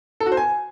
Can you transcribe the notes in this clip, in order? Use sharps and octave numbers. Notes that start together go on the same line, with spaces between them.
A4
F#4
C5
G#5